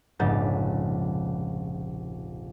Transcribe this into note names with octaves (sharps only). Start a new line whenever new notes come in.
F1 A#1 G#2 C#3 G6 A6